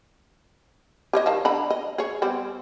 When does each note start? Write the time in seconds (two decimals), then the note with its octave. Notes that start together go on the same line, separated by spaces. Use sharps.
1.13 G4 C#5 D#5
1.26 D#3 F5 A5
1.45 D3 A#5 B5
1.70 D#5
1.98 G#4 C#5
2.22 G3 B3 C4